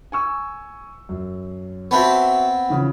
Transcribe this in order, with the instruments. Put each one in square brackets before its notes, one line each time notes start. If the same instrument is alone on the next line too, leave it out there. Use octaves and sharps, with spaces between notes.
[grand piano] G#5 C#6 E6
F#2
[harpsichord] B3 C4 [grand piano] F#4 E5 A5
[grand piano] C#3 E3 F3